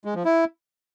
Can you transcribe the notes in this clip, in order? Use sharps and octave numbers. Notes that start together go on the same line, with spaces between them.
G#3
F3
E4